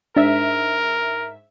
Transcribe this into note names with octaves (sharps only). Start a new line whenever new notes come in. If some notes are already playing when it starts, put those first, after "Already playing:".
G#2 D4 A#4 E5